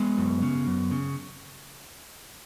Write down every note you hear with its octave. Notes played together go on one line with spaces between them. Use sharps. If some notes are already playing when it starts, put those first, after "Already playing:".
Already playing: G#3 B3
F#2
C#3
F#2
C#3